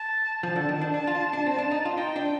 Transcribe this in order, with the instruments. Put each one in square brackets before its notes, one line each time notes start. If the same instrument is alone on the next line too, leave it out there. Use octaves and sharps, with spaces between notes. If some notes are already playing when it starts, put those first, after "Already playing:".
Already playing: [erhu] A5
[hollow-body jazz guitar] F3 [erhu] A5
[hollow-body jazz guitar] D3
D#3
D4
[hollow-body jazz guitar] D4 [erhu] A5
[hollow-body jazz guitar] F4
D4
C4
D4
D#4
F4
[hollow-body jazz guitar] D#4 [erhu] G5
[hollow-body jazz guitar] D4